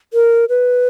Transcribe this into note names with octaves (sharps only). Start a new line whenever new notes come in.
A#4
B4